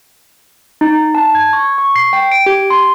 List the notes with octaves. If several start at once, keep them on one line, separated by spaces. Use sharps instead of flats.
D#4
A5
G#6
C#6
C#6
C7
G5
D7
G4
C6